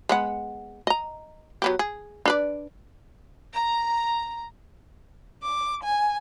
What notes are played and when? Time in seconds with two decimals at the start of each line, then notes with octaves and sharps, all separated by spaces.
0.09 G#3 B3 F#5
0.87 D#5 A#5
1.62 F#3 B3 G4
1.79 G#4
2.25 D4 B4 D5
3.54 A#5
5.43 D6
5.83 G#5